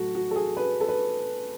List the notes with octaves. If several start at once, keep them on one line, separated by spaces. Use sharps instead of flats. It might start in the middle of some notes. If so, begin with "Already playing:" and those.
Already playing: A2 F#3 F#4 A4
F#4
A4
G#4
B4
A4
B4